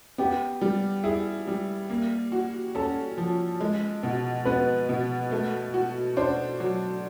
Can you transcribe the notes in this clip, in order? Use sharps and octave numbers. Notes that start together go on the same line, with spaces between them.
B3 G4
G3
E4 G#4
G3
A#3
F#4
C#4 A4
F3
G#3
B2
B3 B4
B2
A3
F#4
D4 C5
F#3